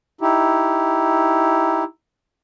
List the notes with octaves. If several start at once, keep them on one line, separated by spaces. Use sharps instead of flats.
D#4 E4 G4